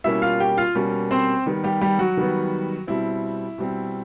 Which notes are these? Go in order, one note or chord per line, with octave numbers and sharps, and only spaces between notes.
B2 G3 A#3 C#4 E4 E5
F4 F5
G4 G5
F4 F5
B2 G3 A#3 C#4
C4 C5
D#3 G3 B3
G3 G4
G3 G4
F#3 F#4
D#3 G3 B3
B2 G3 C4 E4
B2 G3 C4